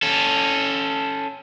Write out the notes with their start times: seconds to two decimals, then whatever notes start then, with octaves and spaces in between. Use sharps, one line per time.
0.02 C#4 A4